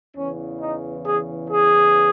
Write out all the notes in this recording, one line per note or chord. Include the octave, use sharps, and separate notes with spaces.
E2 C#3 E3 C#4
D#4
G#4
G#4